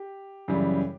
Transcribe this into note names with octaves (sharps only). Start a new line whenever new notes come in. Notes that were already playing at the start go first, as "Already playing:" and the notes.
Already playing: G4
F#2 C#3 E3 G3